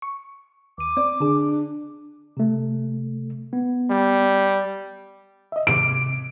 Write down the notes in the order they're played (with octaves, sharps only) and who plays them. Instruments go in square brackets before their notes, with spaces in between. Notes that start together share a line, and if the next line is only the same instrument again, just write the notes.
[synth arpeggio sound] C#6
[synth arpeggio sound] D#2 D#7 [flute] D6
[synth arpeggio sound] C4 D5
[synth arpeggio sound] D3 G#4 [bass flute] D4
[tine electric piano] C3 A3
B3
[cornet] G3
[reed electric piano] D#5 E5
[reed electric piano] G#2 C3 D6 [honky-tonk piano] D7